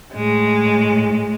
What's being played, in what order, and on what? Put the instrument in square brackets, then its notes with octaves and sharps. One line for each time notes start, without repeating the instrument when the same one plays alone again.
[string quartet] A2 G#3